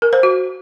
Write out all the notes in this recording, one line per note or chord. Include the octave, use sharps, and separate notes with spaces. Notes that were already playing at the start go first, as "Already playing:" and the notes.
A#4
C5
F#4